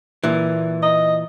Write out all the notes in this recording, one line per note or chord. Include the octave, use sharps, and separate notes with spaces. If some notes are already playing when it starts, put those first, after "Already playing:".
A#2 E3
D#5